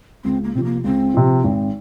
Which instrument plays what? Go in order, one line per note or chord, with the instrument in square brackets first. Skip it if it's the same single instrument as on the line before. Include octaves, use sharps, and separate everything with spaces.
[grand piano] C#2 [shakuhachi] C4
[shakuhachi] A#3
[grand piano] C3 F3 [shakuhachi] C4
[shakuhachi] A#3
[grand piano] C#2 [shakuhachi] C4
[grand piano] C3 F3
G#1